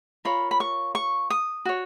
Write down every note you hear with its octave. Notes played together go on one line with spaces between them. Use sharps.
F4 A#4 C#5 B5
B5
C#6
C#6
D#6
F#4 C#5